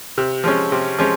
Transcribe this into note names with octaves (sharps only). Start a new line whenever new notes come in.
C3
F3 G#3 C#4
C3
F3 G#3 C#4